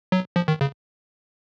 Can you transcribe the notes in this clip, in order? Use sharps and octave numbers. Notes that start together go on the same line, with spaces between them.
F#3
F3
D#3
C#3